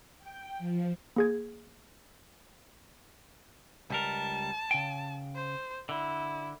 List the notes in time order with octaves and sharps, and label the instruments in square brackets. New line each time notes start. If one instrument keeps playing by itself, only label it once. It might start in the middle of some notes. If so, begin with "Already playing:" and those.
[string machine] G5
F3
[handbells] A#3 G#4 G#6
[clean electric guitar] C#2 G3 A#4 [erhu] A5
[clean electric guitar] C#3 G5
[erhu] C5
[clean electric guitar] D3 [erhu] E4